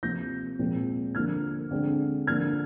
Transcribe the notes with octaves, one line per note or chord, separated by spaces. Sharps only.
C3 F3 A#3 G6 A#6
A#2 F3 G#3 C4
D3 F3 A#3 F6 G#6
D3 G#3 C4
D3 F3 A#3 F6 G#6